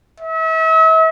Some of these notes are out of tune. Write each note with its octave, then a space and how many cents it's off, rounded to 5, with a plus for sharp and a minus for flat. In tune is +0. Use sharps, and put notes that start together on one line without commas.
E5 -40